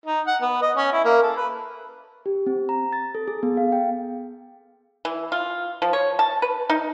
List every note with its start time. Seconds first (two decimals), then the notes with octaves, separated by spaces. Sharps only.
0.06 D#4
0.27 F#5
0.42 B3
0.62 D#5
0.77 C#4
0.92 E4
1.05 A#3
1.23 A4
1.37 B4
2.26 G4
2.47 C4
2.69 A#5
2.93 A6
3.15 A4
3.28 G#4
3.43 B3
3.57 F5
3.72 G5
5.05 E3
5.32 F4
5.82 F3
5.93 C#5
6.19 A5
6.42 B4
6.70 D#4